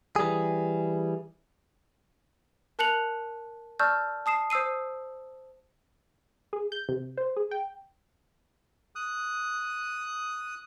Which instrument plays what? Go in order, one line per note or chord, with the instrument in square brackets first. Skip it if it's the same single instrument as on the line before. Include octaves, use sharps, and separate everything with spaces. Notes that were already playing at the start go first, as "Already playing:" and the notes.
[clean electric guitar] E3 G3 G#4
[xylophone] A#4 A5 F#6 C#7 F7 F#7
D5 A5 C#6 E6 F6 G6
A5 D#6 C7 E7
C5 D#6 E6 C7 D#7
[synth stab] G#4
G6
C3
C5
G#4
G5
[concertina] D#6 F#6